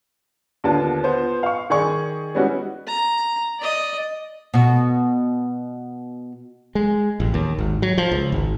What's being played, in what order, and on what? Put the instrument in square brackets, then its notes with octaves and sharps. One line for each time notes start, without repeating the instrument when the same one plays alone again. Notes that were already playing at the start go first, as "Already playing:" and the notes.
[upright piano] D#2 D3 B3 F4 A5
B3 F4 C5
F5 C#6
D#3 G#4 D5 C#6
G3 G#3 B3 C#4 E4 F#4
[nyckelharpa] A#5
D5 D#5
[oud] B2 F#4
[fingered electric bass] G#3
A1
D#2
G#1
F#3
F3
C#2
G#1